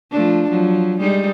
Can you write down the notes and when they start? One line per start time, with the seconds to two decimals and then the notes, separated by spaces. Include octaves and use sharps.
0.11 F3 A3 D4
0.50 F3 F#3
1.00 G3 G#3 D#4